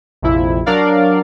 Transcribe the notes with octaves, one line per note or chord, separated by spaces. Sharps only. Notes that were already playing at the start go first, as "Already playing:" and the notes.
A#1 F2 C3 E4
F#3 D4 A#4 D5 F5